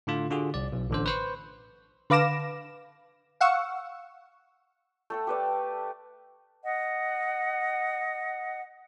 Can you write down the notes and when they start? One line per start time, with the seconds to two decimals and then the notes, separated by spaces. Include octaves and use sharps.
0.07 A2 D3 F4
0.30 D3 F4 F#4 G#4
0.54 C2 D5
0.72 B1
0.90 A1 D3 C5
1.06 B4 C5 C#6
2.10 D3 B4 F5 D6 A#6 E7
3.41 F5 F#5 C#6 E6
5.10 A3 A4 G5
5.27 G4 B4 D5
6.64 D#5 F#5